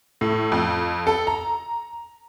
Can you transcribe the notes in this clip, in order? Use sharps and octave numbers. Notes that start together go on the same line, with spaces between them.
A2
F2
A4
A#5